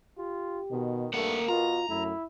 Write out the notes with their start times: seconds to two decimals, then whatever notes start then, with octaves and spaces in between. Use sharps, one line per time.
0.18 F4 G4
0.71 B2 D#3
1.14 G2 A3 A#3 A#4 F#5
1.48 B2 F4 A#5
1.88 F#2 A3 E4